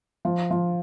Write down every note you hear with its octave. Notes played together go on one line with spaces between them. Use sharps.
F3
F3